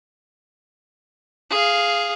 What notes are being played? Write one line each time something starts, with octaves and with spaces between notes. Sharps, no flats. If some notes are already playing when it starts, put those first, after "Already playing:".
G#4 F5